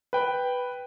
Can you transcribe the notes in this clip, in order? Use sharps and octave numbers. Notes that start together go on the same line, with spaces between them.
B4 G5